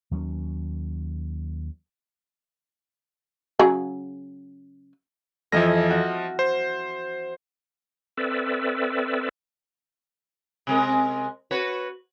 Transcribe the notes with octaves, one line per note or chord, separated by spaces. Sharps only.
D#2 F#3 B3 C#4
C#3 F#3 G#4
F2 E3 F3 D#5 A#6
F#4
C5
C4 A4 B4 D5 E5
C3 G#3 A#4
F#4 B4 C#5